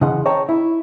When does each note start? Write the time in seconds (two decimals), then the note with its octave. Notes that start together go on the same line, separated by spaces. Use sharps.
0.01 C#3 E3 D#5 F#5 C6
0.25 G#4 C#5 D#5 G5 A5 A#5
0.49 E4